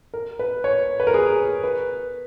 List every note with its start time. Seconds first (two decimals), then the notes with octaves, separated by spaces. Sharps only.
0.14 A#4
0.39 B4
0.64 C#5
1.00 B4
1.07 A#4
1.14 G#4
1.64 B4